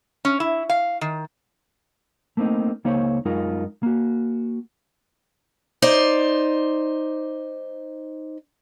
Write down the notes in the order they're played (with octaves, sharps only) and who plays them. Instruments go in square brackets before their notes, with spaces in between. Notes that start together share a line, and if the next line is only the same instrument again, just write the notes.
[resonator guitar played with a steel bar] C#4
E4
F5
D#3
[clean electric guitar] A3 A#3 C4 D4 D#4
C#2 A#3 D#4 C5 C#5
F#2 G#3 D#4 F4 A#4
A#3 F#4
[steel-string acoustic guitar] D#4 C5 D5